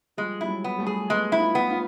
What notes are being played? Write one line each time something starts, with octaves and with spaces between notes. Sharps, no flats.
F3 G3 G#3
G3 E4
F#3 G#3
B3
G3 A3
G#4
G#3 A3 B3
E4
D#4 F4
B3
D#4 F4